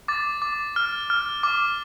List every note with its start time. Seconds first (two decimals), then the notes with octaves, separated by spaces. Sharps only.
0.08 D6 A6
0.42 D6
0.76 F6
1.10 F6
1.43 D6